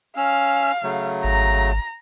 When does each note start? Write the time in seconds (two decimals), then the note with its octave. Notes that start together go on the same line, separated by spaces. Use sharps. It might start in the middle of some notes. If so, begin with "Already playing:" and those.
0.17 C#4 F5 E6 F6
0.83 C#3 F#3 A3
1.24 G#1 A#5